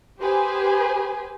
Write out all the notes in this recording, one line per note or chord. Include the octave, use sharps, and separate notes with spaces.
G4 G#4 B4 C5 G#5